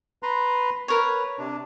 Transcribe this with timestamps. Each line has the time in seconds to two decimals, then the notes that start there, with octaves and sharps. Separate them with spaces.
0.23 B4 A#5 C6
0.88 A#4 B4 C#5
1.39 C3 D4